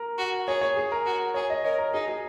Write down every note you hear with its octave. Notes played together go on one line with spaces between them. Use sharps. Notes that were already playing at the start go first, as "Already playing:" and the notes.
Already playing: A#4
F#4
G#4 C#5
C#5
G#4
A#4
F#4
G#4 C#5
D#5
A#4 C#5
A#4
D#4 G#4
G#4